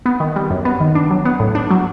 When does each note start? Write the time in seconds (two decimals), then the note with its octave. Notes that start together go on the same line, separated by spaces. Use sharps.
0.06 B3
0.20 D#3
0.36 G3
0.50 F#2
0.65 B3
0.80 D#3
0.95 D4
1.11 F#3
1.25 B3
1.40 A2
1.55 D4
1.71 F#3